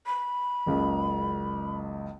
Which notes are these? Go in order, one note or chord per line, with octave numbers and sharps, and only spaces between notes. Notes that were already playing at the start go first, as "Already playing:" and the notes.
B5
F#1 C#2